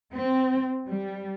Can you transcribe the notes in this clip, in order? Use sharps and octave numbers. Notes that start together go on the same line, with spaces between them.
C4
G3